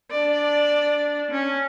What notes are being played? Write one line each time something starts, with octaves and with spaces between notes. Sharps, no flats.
D4 D5
C#4